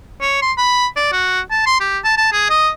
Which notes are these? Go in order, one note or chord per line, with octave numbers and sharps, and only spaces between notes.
C#5
C6
B5
D5
F#4
A5
C6
G4
A5
A5
G#4
D#5